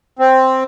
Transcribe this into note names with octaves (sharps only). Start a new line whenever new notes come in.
C4